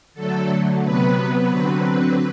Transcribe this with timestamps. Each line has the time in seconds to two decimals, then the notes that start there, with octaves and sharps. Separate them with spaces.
0.14 D3 F#3 A3 A4
0.81 C3 F#3 B3 B4
1.49 D3 F#3 C4